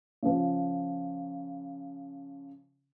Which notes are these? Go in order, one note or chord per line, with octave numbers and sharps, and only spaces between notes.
C#3 F3